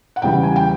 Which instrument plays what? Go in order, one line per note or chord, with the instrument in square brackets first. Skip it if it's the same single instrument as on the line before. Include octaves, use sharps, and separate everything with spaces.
[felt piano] F#5
E2 C#3 E3 G3 G5
G#5
G5